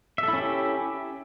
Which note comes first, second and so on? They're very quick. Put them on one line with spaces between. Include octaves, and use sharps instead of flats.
E5 A4 E4 C#4 G4